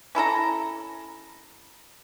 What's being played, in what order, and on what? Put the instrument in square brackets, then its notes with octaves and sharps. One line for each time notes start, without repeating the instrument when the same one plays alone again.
[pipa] C#4 E4 A4 A#5